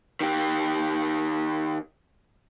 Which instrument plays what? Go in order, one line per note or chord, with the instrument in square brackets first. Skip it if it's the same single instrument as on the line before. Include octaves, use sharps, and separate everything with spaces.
[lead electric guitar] D#3 G4